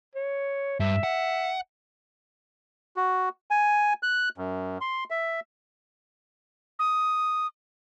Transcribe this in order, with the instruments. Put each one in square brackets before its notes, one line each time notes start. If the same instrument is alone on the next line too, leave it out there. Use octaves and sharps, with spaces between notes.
[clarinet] C#5
[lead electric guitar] G2 [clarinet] E5
[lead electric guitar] F#5
[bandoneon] F#4
G#5
F#6
F#2
C6
E5
[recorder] D#6